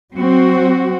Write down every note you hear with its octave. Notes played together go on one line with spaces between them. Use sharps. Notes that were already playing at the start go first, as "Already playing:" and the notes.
F#3 C4 F#4